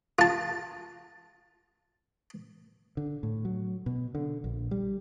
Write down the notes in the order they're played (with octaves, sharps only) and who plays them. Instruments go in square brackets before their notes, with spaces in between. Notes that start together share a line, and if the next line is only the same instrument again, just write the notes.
[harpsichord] F4 A5
[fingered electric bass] D3
A2
F#3
B2
D3
A#1
G3